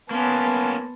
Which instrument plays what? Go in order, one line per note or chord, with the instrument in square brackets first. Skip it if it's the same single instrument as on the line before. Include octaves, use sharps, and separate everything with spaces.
[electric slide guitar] A#3 C#4 [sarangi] B3 [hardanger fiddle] A5 C6